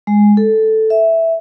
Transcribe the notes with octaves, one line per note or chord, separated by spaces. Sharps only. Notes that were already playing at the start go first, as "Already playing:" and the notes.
G#3
A4
E5